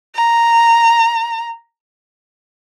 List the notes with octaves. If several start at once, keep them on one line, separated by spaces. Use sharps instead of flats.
A#5